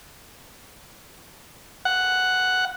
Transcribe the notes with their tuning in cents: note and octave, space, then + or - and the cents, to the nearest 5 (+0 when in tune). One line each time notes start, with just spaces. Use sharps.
F#5 +0